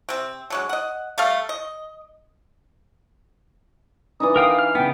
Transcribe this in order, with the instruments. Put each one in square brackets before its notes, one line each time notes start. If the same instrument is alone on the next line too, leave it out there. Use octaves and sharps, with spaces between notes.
[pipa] C3 C4
D3 F#3 G#3
D#5 F#5
G3 A3 A4 F5
D#5
[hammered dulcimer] E3 D4 D#4 [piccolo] D#6
[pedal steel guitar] A#4 G5 D#6 [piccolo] F5
[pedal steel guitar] F6
[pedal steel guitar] C#3 B3 [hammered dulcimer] F5 [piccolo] G5